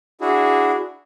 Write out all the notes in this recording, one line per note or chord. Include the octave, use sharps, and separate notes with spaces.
D4 E4 F#4 G#4